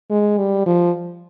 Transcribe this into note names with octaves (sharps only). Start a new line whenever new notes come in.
G#3
G3
F3